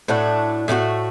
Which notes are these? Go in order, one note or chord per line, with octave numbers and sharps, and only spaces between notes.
A2 A3 D4 F#4
A2 A3 D4 F#4